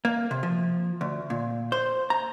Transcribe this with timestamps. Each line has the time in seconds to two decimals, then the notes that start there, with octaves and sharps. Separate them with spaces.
0.05 A#3
0.31 C3
0.43 F3
1.01 D2
1.30 A#2
1.72 C5
2.10 A#5